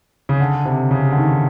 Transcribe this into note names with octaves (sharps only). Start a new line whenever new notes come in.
C#3
D3
C3
C#3
D3
D#3